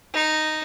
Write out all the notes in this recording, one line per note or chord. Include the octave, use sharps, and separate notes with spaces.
D#4